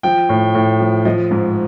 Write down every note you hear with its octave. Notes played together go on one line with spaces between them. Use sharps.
F3 G5
A2
A2
F3
F3 D#5
G#2